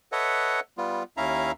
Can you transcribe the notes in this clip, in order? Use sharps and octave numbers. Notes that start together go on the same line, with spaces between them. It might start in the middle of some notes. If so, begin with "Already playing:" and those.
A4 B4 C#5 D#5 E5 F#5
G3 B3 F4
D#2 C#4 E4 E5 F5 A#5